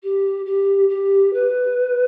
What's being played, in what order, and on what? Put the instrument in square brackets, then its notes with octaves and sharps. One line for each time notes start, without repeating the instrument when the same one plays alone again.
[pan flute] G4
G4
G4
B4